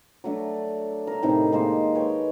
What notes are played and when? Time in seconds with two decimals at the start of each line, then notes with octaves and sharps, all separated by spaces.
0.24 F#3 A3 D4
1.07 A#4 E5
1.23 A2 C3 D#3 D#4
1.52 D#3 G#3 A#3 C5
1.95 B4 C#5 G5